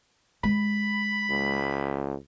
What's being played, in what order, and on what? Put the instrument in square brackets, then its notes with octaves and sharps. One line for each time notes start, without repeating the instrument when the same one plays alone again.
[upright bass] G#3 [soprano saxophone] B5
[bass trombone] C#2